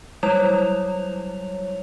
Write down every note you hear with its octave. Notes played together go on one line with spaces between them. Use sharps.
F#3 G3 E4 C#5 F7